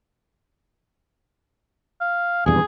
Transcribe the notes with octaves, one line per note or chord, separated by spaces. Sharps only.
F5
D#1 E2 G2 G#4